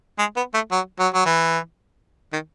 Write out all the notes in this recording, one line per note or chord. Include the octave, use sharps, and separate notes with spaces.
G#3
B3
A3
F#3
F#3
F#3
E3
D#3